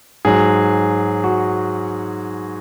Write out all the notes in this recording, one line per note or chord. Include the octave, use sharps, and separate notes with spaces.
G#2 F#3 G#4
F#4